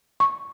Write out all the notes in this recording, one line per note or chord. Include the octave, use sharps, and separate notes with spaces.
C#6